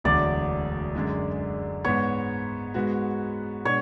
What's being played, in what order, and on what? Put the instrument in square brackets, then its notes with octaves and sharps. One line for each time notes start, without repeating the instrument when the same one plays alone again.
[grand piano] E1 D2 D3 F#3 [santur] D5
[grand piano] F#2 D3 G#3 D4
[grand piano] G#2 G#3 B3 [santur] C#5
[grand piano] G#2 G#3 B3 F#4
[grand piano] B2 G#3 D4 [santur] C#5